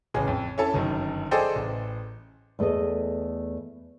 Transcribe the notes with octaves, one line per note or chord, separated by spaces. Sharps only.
A1 C#3 G#4 C#5
F2
C#4 E4 A4 C#5 A5
G1 F#2 D#3
G#4 A4 C5 D5 D#5 G5
A1
E2 A3 G#4 A4 D#5